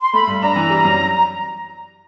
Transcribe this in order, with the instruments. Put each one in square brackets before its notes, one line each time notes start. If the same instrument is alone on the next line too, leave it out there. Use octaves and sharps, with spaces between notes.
[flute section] C6
[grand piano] A3 [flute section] B5
[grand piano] G2
[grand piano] D4 [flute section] A#5
[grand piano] E3
G3
F#2